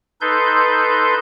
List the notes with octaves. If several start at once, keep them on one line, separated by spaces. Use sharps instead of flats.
D#4 A4 B4 C6 G6